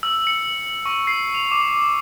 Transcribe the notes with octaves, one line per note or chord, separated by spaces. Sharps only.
E6
C#7
C#6
C7
F7
D6